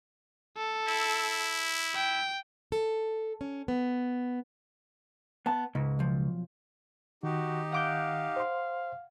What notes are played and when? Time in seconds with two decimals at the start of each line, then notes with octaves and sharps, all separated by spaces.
0.57 A4
0.88 E4
1.95 G5
2.72 A4
3.41 C#4
3.68 B3
5.46 B3 A5
5.75 C#2 G#2
5.99 B1 F3
7.23 D#3 D#4 F#4 G4
7.72 F5 F#5 D6 G6
8.36 C5 C6